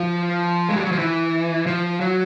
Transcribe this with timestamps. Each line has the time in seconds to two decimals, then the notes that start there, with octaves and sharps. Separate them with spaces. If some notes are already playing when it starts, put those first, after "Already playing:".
Already playing: F3
0.69 G#3
0.77 G3
0.84 F#3
0.91 F3
0.98 E3
1.67 F3
2.00 F#3